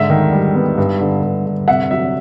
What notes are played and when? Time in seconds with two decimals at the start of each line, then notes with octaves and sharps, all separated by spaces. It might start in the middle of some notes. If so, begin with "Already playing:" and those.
Already playing: G#2 D3 E5
0.10 D#3
0.32 G3
0.55 B3
0.78 G2
1.01 D3
1.23 G2
1.46 D3
1.68 C3 E5 F#5
1.91 F#3 E5